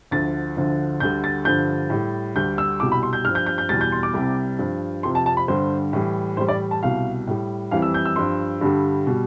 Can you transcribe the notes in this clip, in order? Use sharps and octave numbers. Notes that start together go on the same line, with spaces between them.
D2 D3 F3 A6
D2 D3 F3
D2 D3 G3 G6
A6
G2 D3 F3 G6
A2 G3
D2 D3 G3 G6
E6
C2 B2 G3 D6
B5
C6
G6
G2 F6
F3
G6
G6
G6
E2 B2 G3 A6
G6
C6
D6
C2 C3 G3
G2 F3
F2 C3 F3 C6
A5
A5
B5
G2 D3 G3 C5
A2 E3 G3
A2 E3 G3 C5
D5
A5
C2 B2 G3 F5
A2 G3
F2 E3 G3 F5
E6
G6
E6
G2 F3 C6
G2 D3 G3
B2 G3